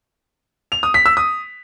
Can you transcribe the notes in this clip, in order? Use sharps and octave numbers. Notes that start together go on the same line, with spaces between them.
F7
D#6
B6
E6
D#6